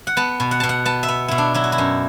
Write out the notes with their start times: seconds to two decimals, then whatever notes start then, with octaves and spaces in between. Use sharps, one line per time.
0.07 F#5
0.17 B3 A5
0.40 B2
0.51 F#5
0.60 B2 A5
0.69 F#5
0.85 B3 A5
1.03 E5
1.08 B3
1.28 B2 E4
1.38 D4
1.54 F#3 E4
1.64 F#4
1.72 E4
1.78 F#2